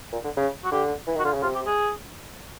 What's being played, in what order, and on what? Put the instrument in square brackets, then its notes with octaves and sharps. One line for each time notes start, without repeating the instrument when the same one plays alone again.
[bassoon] A#2
D3
C#3
[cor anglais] F#4
[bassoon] D3 [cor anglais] G4
[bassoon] E3
[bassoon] D#3 [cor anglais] F#4
[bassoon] D3 [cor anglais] F4
[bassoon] C#3
[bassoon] C3 [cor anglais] F4
[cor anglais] G4
G#4